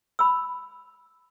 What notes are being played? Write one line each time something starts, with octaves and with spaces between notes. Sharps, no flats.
B5 E6